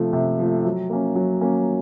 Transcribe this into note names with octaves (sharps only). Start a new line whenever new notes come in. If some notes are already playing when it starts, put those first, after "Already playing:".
Already playing: C3 F3 A3
C3
F3 A3
F#3
A#3 C#4
F#3
A#3 C#4